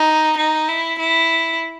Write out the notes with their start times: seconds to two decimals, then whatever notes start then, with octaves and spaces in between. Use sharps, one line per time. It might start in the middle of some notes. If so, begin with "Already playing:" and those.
Already playing: D#4
0.37 D#4
0.68 E4
0.99 E4